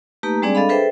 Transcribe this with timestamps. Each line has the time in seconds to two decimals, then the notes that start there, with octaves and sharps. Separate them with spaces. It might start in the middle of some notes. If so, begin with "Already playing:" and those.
0.23 A3 A#3 D#4 G4 B4 A#5
0.42 G3 G#3 C4 D4 G#4 D5
0.55 D4 A4 D#5 F5 B5
0.69 G#4 A4 B4 C5 E5 G5